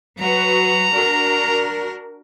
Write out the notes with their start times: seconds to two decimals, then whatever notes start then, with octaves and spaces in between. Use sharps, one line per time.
0.20 F#3 F#4 B4 A#5
0.90 D4 F#4 A#4